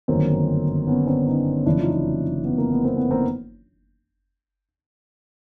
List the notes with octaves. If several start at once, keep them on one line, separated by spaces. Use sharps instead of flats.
G1 F#2 D#3 A#3 C4
B3 C#4
C4 D4
C#4 D#4
F#1 F2 C#3 E3 D4 E4
D#4 F4
D#4 F4
B3
A#3
B3
A#3 C4
B3
A#3 C4